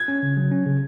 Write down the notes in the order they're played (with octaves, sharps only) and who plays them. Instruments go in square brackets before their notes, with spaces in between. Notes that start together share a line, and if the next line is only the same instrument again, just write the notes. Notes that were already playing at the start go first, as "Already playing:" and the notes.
Already playing: [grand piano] G#6
[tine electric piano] C#4
C#3
F#3
C#4
C#3